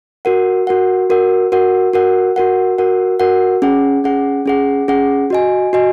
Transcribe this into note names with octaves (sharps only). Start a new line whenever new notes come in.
F#4 A#4 F#5
F#4 A#4 F#5
F#4 A#4 F#5
F#4 A#4 F#5
F#4 A#4 F#5
F#4 A#4 F#5
F#4 A#4 F#5
F#4 A#4 F#5
C#4 G#4 F#5
C#4 G#4 F#5
C#4 G#4 F#5
C#4 G#4 F#5
F#4 D#5 G#5
F#4 D#5 G#5